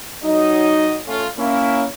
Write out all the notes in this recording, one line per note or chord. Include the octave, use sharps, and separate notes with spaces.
F#3 D#4 D#5
A3 C#4 F4
A#3 C#4 E4